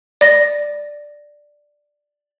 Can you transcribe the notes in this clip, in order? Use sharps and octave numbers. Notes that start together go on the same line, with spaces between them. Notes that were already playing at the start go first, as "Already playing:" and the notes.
D5 A#6